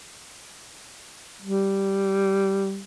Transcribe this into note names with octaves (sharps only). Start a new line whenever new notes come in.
G3